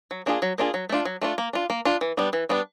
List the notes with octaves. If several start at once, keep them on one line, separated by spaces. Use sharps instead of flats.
F#3
A#3 D4 F4 G#4
F#3
A#3 D4 F4 G#4
F#3
A3 D4 F4
F#3
A3 D4 F4
A#3
D4 F4
A#3
D4 F4
E3
G3 B3 D4
E3
G3 B3 D4